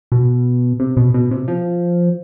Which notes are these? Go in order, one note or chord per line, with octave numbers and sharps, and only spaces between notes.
B2
C3
B2
B2
C3
F3